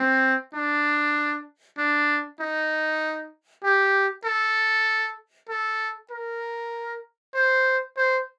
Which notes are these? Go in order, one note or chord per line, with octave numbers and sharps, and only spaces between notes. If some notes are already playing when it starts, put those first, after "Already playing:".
Already playing: C4
D4
D4
D#4
G4
A4
A4
A#4
C5
C5